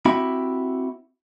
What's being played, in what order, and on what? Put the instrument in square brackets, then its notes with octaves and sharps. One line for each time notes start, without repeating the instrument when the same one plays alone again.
[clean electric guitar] C4 E4 F#4 G4 E5 B5